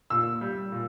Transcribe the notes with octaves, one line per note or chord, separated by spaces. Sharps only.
A#2 E6
G3
A#2